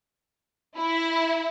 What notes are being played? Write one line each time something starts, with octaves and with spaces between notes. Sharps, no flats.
E4